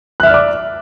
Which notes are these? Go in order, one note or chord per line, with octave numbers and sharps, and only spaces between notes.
D5 E5 D6 F6 F#6